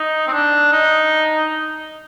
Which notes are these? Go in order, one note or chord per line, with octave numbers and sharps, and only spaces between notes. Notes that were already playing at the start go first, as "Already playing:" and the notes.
Already playing: D#4
C4
D4
D#4